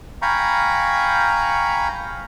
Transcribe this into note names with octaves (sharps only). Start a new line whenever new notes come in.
F5 G5 G#5 A#5 B5 C#6